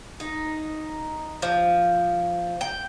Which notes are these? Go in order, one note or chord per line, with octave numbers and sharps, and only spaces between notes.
D#4
F3
G5